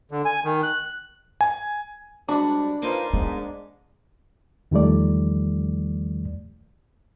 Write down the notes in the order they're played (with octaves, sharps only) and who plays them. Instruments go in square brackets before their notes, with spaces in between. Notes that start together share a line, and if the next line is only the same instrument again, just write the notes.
[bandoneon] D3
G#5
D#3
F#6
[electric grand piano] G#5
[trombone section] C3 G3 G#3 [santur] D4 [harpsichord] F#4 B5
[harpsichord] A#3 D#4 [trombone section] F4 B4 C5
[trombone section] G#2 [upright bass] B3
[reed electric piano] E2 D#3 F3 G3 A3 D5